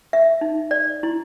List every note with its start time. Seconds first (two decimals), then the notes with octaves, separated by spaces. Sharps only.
0.13 E5
0.41 D#4
0.71 D5
1.03 E4